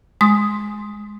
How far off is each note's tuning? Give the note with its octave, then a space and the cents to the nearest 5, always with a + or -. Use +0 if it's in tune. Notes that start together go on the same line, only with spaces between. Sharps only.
G#3 +0 C6 +0 D#6 +0